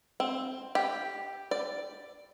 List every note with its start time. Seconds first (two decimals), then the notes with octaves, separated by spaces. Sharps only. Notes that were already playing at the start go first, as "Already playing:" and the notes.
0.20 C4
0.75 G4
1.51 D5